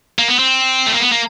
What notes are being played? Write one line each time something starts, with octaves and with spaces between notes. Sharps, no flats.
A#3
B3
C4
A3
A#3
B3
A#3